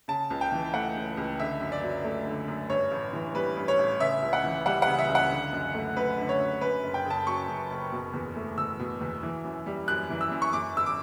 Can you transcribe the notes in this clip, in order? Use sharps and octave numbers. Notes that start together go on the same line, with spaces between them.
C#3 A5
C#2
G5
E3
A3 F#5
C#3
C#2
D3 E5
F#2
D5
F#3
A3
D3
F#2
G2 C#5
A1
E3
G3 B4
G2
C#5
A1
C#3 E5
C#2
F#5
E3
G3 F#5
F#5
C#3
E5
C#2
F#5
D3
F#2
A3
F#2 B4
D3
C#5
F#2
F#2 B4
F#1
G5
C#3 A5
F#3 C#6
F#2
F#1
B2
E2
A3
E2 E6
B2
E2
E3
F#2
G3
F#2 F#6
E3
E6
F#2
C#6
F#2 D6
G1 E6
D6